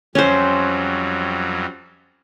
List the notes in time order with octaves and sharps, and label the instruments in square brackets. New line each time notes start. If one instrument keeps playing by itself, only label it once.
[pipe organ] F2 F#3 G3 [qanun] C#4 C5